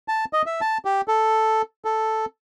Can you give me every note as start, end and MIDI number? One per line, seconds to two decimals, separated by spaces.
0.08 0.25 81
0.33 0.42 75
0.46 0.61 76
0.61 0.78 81
0.85 1.01 67
1.08 1.62 69
1.85 2.26 69